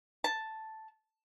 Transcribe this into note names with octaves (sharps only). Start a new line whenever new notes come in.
A5